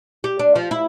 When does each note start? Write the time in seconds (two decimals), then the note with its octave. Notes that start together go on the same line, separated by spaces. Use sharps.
0.24 G4
0.39 D4
0.56 F3
0.71 E4